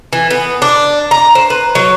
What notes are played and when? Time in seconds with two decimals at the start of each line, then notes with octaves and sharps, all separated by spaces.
0.13 E3
0.31 B3
0.62 D4
1.11 A#5
1.35 C5
1.50 B4
1.75 F#3